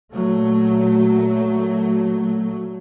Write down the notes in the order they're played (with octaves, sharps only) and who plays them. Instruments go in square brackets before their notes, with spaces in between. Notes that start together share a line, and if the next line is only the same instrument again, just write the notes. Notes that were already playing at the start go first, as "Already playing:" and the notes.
[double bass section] A#2 F#3 A3